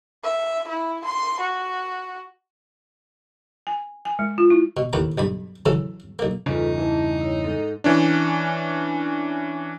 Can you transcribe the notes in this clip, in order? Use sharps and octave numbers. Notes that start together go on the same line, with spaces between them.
E5
E4
C6
F#4
G#5
G#5
G#3
F4
E4
B2
D#2 A2 B4 A#5
B1 G2 B5
C#3 E3 F#3 A4
B1 A#3
E2 G2 C#3 D#4 F4 A4 B4
E3 E4 A5
E4 C#5
G#2 A4
E3 C#4 D4